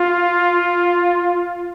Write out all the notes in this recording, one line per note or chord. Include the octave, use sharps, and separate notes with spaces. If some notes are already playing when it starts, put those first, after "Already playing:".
Already playing: F4